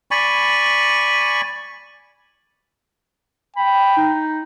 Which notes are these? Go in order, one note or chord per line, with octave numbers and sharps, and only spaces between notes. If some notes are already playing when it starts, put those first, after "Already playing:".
D5 G#5 B5 C#6
G5 B5
D#4